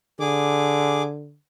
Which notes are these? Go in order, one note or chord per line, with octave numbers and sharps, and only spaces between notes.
D3 G#4 D6